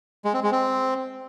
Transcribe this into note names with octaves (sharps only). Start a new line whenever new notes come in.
G#3
C4
G#3
C4